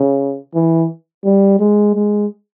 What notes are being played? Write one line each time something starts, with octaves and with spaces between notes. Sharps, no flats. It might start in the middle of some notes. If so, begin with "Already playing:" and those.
Already playing: C#3
E3
G3
G#3
G#3